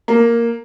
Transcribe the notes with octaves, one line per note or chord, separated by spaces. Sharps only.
A#3